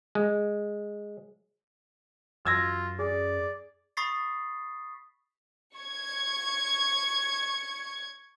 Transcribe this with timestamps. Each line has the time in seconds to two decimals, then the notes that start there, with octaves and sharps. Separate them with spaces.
0.15 G#3
2.45 F#2 F4 E6 G#6 A#6
2.99 G#4 D5
3.97 B5 C#6 D#6 A6 B6 C7
5.75 C#6 G#6